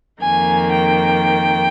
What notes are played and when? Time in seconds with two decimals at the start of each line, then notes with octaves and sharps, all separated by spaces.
0.21 F2 D#3 A#3 G#5
0.72 G5